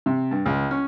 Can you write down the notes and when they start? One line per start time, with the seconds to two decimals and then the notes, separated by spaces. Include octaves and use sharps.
0.06 C3
0.31 G2
0.46 C#2
0.71 C#4